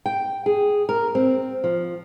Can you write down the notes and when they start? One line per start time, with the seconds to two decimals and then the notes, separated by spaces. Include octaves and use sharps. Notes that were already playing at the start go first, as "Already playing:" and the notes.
0.06 G5
0.46 G#4
0.89 A#4
1.15 C4
1.64 F3